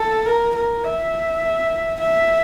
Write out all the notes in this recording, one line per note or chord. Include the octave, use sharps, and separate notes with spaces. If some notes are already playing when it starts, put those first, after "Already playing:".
Already playing: A4
A#4
A#4
E5
E5